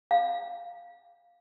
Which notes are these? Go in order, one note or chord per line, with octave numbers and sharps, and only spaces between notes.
F5